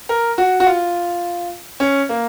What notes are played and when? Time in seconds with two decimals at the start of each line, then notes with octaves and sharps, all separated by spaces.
0.09 A#4
0.38 F#4
0.60 F#4
0.66 F4
1.80 C#4
2.09 A#3